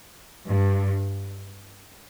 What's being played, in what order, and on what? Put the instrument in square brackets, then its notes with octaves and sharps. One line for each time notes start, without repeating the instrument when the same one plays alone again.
[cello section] G2